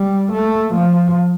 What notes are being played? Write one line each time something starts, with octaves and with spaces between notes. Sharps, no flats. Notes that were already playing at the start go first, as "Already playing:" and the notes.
Already playing: G3
A3
F3